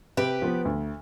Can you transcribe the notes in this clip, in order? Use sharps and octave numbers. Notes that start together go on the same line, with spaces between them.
C3 G4 B4
F3 B3
D2